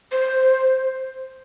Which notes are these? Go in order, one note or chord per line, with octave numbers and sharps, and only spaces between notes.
C5